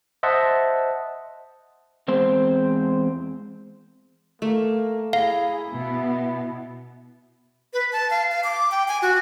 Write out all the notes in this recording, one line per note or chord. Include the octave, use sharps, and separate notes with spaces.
C5 D#5 E5 F#5 A5
E2 G#3 C4 C5
A3 A#3
E4 G#4 F5 A#5
B2 B3
B4
A5
F5
F5
D6
G5
G#5
F#4